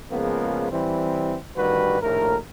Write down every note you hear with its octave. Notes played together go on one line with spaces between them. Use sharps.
C#3 F3 G#3 A#3 B3
E3 G3 C4
A1 G2 D#3 G3 F#4 B4
A#1 D#2 A2 A3 A#4